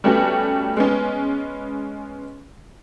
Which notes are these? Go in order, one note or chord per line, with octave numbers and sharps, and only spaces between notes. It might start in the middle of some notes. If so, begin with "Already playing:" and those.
G3 A3 B3 C#4 F#4
G#3 B3 C#4